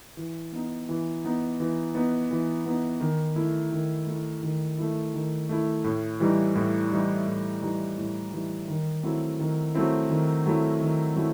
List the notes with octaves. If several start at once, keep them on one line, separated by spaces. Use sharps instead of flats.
E3
B3 D#4
E3
B3 D#4
E3
B3 D#4
E3
B3 D#4
D#3
A3 E4
D#3
A3 E4
D#3
A3 E4
D#3
A3 E4
A2
E3 G3 D#4
A2
E3 G3 D#4
A2
E3 G3 D#4
A2
E3 G3 D#4
D#3
F#3 A3 C4 E4
D#3
F#3 A3 C4 E4
D#3
F#3 A3 C4 E4
D#3
F#3 A3 C4 E4